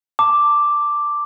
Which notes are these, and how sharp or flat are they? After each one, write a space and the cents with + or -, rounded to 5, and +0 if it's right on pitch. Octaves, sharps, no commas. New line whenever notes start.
A5 +30 D6 +0